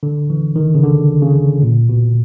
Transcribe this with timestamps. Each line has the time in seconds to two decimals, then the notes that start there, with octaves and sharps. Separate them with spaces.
0.03 D3
0.30 E3
0.56 D#3
0.75 C#3
0.83 D3
1.22 C#3
1.63 A#2
1.89 B2